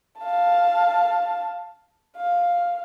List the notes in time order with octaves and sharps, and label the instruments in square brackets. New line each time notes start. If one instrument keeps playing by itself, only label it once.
[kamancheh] F5 A5
F5